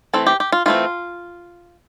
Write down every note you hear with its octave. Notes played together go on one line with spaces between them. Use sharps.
E3 A3 C4 A4
G4
G4
F4
E3 A3 C4 F4